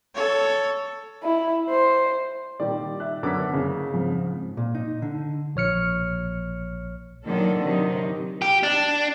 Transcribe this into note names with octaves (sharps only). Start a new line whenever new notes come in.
A4 C#5
E4
C5
A#2 D#3 G3 D5
E5 F#6
F#2 D3 B3 F#5 D6 B6
F#1 C#3
F2 G#2 F3
A#2
D#4
D3
A#1 C#5 F6 C#7
A#2 D3 D#3 F#3 A4
C3 D#3 F#3 D#4
G4
D4